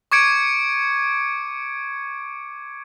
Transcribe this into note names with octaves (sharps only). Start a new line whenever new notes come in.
C#6 D6 G#6 C#7 D7